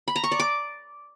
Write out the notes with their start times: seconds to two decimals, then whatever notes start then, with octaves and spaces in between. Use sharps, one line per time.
0.08 B5
0.16 A#5
0.24 C#6
0.32 D5
0.40 D6